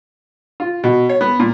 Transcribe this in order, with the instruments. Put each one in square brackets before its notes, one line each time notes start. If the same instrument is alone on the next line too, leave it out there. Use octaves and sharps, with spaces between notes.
[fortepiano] F4
B2
C#5
B3
A#2